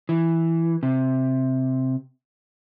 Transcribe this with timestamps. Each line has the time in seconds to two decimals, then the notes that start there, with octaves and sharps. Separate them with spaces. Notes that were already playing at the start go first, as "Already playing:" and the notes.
0.09 E3
0.83 C3